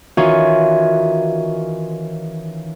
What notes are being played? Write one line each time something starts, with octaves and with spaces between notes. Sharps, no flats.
D#3 E3 C#4 F4 F#4 C#5